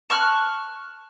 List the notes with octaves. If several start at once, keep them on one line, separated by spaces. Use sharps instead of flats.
A5 C#6 F6 F#6